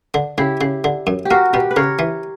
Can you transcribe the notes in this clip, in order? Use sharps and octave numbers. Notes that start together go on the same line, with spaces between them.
D3
C#3 E4 G4
C#3
D3
F#2
G4
A#3 F#4 A#4
B2 G4 B4
B4
C#3 A#4 C#5
E3